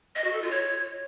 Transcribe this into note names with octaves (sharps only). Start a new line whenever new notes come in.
D#5
F#4
A4
F4
C#5